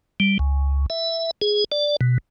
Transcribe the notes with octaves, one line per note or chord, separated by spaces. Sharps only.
G3
C#2
E5
G#4
D5
B2